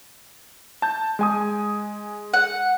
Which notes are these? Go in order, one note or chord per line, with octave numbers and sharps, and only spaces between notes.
A5 G6
G#3 G#5 D#6
F#5